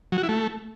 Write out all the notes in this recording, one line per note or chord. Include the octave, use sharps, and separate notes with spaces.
F#3
F#4
E4
A3